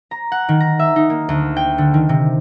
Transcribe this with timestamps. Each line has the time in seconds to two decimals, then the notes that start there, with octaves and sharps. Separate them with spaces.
0.11 A#5
0.32 F#5
0.49 D#3
0.60 A#5
0.79 E5
0.96 D#4
1.10 A#3
1.29 D2
1.56 G5
1.78 D3
1.94 D#3
2.09 C3